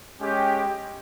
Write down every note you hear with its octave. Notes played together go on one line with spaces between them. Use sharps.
G#3 C#4 G4